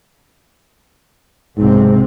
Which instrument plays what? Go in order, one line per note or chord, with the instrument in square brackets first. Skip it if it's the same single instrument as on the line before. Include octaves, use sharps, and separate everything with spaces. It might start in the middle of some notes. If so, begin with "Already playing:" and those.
[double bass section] B1 C3 C4 [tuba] G#2